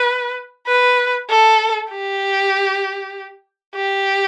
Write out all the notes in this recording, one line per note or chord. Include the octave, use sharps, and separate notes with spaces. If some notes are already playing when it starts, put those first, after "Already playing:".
Already playing: B4
B4
A4
G4
G4